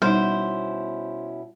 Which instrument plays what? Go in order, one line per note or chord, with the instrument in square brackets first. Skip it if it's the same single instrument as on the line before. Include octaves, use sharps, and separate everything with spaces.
[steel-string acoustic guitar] B2 C#4 E4 [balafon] G3 D#4 [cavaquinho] C5